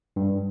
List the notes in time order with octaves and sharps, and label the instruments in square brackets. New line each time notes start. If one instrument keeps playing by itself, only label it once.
[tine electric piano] G2